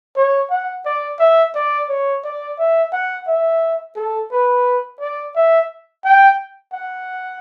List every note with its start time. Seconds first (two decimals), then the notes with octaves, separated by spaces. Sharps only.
0.16 C#5
0.50 F#5
0.86 D5
1.20 E5
1.55 D5
1.89 C#5
2.24 D5
2.59 E5
2.92 F#5
3.27 E5
3.96 A4
4.32 B4
5.00 D5
5.36 E5
6.05 G5
6.73 F#5